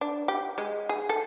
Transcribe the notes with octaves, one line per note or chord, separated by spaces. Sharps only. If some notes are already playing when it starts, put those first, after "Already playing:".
D4
G4
G#3
G#4
A4